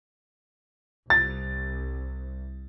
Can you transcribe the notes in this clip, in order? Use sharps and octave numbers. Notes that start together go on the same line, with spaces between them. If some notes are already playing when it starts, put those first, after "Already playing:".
C2 A6